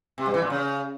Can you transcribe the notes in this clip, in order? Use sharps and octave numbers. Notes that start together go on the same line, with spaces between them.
C3
G2
E3
A#2
C#3